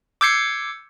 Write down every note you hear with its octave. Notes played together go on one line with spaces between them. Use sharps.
D6 E6 G6 G#6 C7 C#7